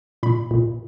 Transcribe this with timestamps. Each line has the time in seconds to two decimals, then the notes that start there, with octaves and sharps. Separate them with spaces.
0.23 A#2 B5
0.51 A#2